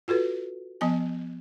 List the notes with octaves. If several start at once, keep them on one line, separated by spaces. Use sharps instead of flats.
F4 F#4 A4 B4
F3 B3 D#5 G#5